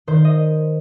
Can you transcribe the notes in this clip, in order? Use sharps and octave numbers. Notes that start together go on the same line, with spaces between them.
D#3 C5
D#5